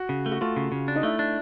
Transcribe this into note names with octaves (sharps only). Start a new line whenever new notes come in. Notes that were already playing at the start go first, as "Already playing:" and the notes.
Already playing: F#4
C#3
A3
F#4
A3 F4
C#3
C#3
D4
D#4
A3 E4
D4